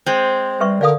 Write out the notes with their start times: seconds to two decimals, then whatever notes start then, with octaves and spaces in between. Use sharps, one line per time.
0.06 G#3 C4 C5
0.60 G3 B4 E5 C#6
0.81 D3 A#4 D5 F5 D#6